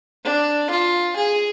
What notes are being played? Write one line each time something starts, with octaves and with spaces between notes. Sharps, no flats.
D4
F4
G#4